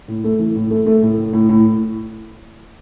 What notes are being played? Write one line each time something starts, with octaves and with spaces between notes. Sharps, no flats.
A2
A3
E3
A2
A3
A3
A2
A2
A2
A2